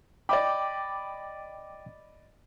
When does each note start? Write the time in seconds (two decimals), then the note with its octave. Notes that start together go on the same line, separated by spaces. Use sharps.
0.29 D5 D#5 G5 B5 D6